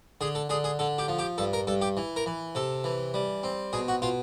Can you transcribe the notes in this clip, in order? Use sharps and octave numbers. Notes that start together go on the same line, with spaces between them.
D3 G#4
A4
D3 G#4
G#4
D3 A4
G4
F3
G4
G2 A4
A#4
G2 A4
G4
E3
A#4
E3
C3 A4
E3
G3
C4
B2 G#4
F#4
B2 F4